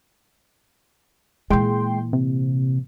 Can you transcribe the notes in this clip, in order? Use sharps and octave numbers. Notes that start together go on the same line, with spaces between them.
A#2 E3 G#3 G5 C6
C3